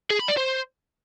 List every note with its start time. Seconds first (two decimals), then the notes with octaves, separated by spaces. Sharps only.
0.11 G#4
0.19 B5
0.28 D5
0.37 C5